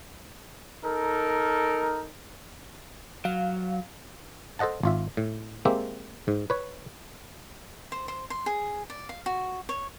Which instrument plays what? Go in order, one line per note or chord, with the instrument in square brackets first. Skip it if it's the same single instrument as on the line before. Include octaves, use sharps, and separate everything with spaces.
[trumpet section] D#4 A4 A#4
[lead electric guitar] F#3 [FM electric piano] F5
[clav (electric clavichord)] A4 C5 D#5 F#5 A5
G#1 F4 E5
A2
G#3 A#3 C4 G4 E5
G#2
B4 C#5
[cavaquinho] C5
C5
C6
G#4
D5
F5
F#4
C#5